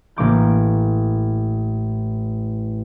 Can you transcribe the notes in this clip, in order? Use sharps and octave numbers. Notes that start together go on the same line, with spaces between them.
A1 A#3 D6 G6